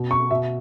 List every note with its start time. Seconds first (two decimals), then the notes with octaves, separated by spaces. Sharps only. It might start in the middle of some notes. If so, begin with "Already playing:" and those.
Already playing: B2
0.11 C#6
0.31 B2 E5